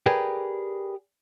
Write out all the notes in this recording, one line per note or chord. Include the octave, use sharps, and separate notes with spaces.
G4 G#4 A#4 B4 D5 G#5